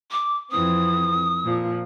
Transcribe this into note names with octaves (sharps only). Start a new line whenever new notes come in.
D6
F2 E3 C4 D#6
A#2 F3